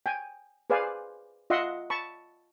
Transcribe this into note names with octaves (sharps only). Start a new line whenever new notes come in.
G5 G#5
G#4 B4 C5 D5 F5 G#5
F4 D#5 E5 F#5 C6
A5 B5 C#6